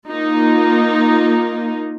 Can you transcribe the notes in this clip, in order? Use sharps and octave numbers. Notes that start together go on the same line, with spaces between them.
A#3 D#4 F4